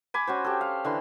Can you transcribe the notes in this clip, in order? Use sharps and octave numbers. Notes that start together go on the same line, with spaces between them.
G#5 B5 D6
C#4 F#4 C5
G4 A4
F5
D3 E3 C6